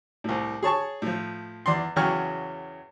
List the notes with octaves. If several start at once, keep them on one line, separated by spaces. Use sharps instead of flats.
C2 A2
G#4 C#5 A5 C#6
A2 F3
E2 D5 C6
E2 C#3 F#3 G5 C#6 F6